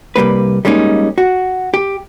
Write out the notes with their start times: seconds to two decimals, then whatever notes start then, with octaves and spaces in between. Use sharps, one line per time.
0.16 C2 G3 A#3 B4
0.65 G3 G#3 A#3 C#4 D#4
1.18 F#4
1.74 G4